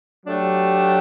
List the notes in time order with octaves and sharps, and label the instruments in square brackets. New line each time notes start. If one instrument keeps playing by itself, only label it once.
[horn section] F#3 A3 D4 G4